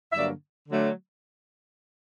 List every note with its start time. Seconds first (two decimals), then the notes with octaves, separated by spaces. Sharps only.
0.13 G2 D3 F#3 A#3 D5 E5
0.69 D3 F#3 A3